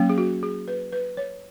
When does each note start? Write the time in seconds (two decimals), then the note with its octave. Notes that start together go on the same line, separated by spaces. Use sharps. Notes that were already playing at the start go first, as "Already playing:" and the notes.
Already playing: F#3 A#3 C#4
0.10 G#4
0.18 F#4
0.43 G#4
0.68 B4
0.92 B4
1.17 C#5